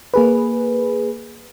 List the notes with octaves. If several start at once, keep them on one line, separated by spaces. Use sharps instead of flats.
A#3 G#4 B4